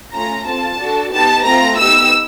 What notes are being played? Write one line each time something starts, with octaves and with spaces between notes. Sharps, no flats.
A3 C#4 F4 A#5
C4 F4 A4 A5
D4 F#4 A4
B3 D#4 G4 A5
A3 C4 F4 A4 A#5
B3 D#4 G4 E6